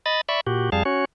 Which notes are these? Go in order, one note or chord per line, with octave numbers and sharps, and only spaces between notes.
D#5 B5 A6
D5 E5 B5 C#6
A#2 F#4 G4
F2 G3 G#4 F5 A5
C#4 F#4 C#5